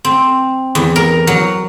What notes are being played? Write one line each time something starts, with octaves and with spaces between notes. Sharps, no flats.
C4
E2
A#4
F#3